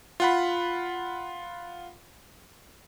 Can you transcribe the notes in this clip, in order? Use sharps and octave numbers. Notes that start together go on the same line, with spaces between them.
F4 F#5 B5